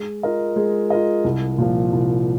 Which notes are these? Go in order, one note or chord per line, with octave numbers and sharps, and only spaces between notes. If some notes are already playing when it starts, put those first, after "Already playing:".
Already playing: G#3
F4 A#4 D#5
G#3
F4 A#4 D#5
C2
A#2 F3
C2